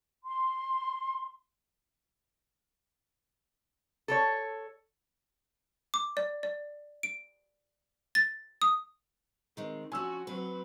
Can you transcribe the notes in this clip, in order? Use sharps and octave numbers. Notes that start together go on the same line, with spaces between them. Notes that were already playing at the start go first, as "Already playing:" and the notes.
C6
A4 A#4 C#5
D6
D5
D5
D7
A6
D#6
D#3 G#3 C4
F3 C#4 F#4 G#5 E6
F#3 C4 B4